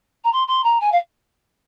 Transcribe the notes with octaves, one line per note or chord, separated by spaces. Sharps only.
A#5
C6
C6
A#5
G#5
F5